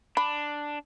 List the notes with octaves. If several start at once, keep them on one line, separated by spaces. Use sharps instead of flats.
D4 B5